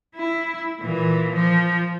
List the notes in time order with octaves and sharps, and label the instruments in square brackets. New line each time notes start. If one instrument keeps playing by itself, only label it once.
[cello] E4
A#2 E3
F3